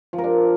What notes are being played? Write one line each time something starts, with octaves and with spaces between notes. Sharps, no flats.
F3
A#4
D4